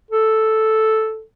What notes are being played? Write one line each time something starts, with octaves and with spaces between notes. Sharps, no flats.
A4